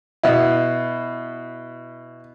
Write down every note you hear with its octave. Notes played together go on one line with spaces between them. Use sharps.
B2 E4